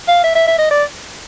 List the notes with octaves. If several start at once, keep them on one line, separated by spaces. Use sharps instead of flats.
F5
E5
E5
E5
D#5
D5